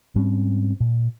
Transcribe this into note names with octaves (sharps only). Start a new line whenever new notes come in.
G#2 G3 C4 C#4
A#2